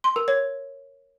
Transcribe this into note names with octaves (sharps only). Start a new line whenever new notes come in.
C6
A#4
C#5